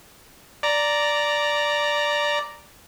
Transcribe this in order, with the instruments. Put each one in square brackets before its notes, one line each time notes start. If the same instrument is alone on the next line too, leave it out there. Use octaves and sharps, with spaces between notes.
[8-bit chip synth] D5 A#5